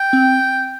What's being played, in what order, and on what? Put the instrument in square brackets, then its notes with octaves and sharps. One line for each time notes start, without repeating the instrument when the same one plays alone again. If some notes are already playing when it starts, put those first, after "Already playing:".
Already playing: [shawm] G5
[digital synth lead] C4